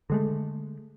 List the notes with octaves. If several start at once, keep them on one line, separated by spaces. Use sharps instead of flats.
D3 G#3 A3